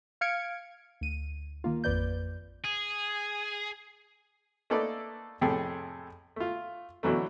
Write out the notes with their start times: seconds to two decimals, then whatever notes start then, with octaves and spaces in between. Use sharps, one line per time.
0.21 F5 F6 G#6 C#7 D7
1.01 D2 D#7
1.64 D#3 A#3 F4
1.84 A1 F2 B4 D5 G6
2.65 G#4
4.70 A3 A#3 D#4 A4 B4 D5
5.41 F2 A2 C3 G#4 A4
6.36 A3 F4
7.03 B2 D3 E3 F#3 A3